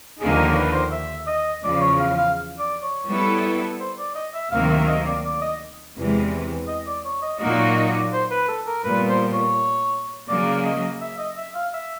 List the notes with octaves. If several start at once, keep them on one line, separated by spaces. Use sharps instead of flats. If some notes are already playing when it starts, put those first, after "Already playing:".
D#2 D3 F3 A#3 D#4 G#4
A#4
B4
C5
E5
D#5
E2 C#3 F3 D5
C#5
F5
F5
D5
C#5
G3 B3 E4 A4
C5
D5
D#5
E5
D2 C3 D#3 F#3 A#3 F5
E5
D#5
D5
D5
D#5
E2 C3 E3 G#3
D#5
D5
C#5
D#5
A#2 F#3 A#3 D#4 F#4 D#5
C#5
D#5
D5
C5
B4
A4
A#4
A#2 G3 B3 B4
C5
C#5
C#3 F#3 A#3 D5
D#5
E5
D#5
E5
F5
E5